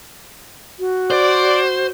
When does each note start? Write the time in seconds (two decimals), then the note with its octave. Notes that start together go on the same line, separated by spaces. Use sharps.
0.79 F#4
1.10 C5 D5